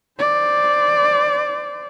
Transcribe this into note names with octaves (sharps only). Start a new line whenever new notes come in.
C5 D5